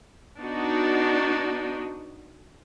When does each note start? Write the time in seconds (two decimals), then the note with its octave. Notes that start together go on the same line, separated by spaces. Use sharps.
0.40 B3 D4 D#4 F#4